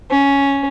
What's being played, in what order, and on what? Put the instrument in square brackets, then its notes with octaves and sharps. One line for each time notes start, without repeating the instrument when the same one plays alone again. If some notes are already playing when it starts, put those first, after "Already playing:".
[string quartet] C#4